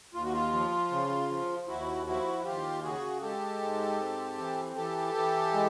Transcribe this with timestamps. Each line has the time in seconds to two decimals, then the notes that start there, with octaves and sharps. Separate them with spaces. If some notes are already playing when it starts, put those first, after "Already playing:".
0.14 D#2 F4
0.24 F#4
0.32 F4
0.53 F3
0.91 C#3
1.30 F3
1.68 D#2 E4 F#4
2.06 F3 E4 F#4
2.45 D#2 F4 G4
2.83 C#3 F#4 G#4
3.22 G#3 G4 A4
3.61 G#2
3.99 C4
4.38 E3
4.76 E3 G4 A4
5.14 E3
5.53 G#3